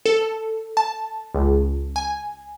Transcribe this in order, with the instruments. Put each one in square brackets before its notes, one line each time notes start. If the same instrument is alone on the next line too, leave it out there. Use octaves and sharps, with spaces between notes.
[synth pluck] A4
A5
C#2
G#5